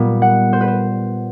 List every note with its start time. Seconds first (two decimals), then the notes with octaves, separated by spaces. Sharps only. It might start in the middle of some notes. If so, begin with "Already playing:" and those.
Already playing: A#2 G3 B3
0.22 F#5
0.53 C5
0.61 B4
0.68 C5